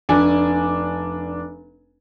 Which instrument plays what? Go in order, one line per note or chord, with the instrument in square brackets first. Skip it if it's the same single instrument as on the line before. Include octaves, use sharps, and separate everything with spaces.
[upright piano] F1 D4 G#5